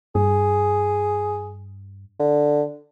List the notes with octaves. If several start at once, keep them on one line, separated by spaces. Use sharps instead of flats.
G2 G#4
D3